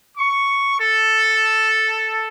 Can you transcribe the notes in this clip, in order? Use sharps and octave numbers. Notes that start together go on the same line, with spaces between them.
C#6
A4